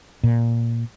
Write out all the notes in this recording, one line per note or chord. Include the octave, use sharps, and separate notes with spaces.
A#2